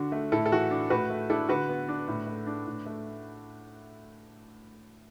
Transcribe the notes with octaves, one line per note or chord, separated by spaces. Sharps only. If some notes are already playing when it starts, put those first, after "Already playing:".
Already playing: D3 D4 F#4
A3
A2 E4 A4
A4
E3 F#4
D4
A2 F#4 B4
A3
D4 E4 A4
D3 F#4 B4
B3
D4
A2
A3
D4
A2
A3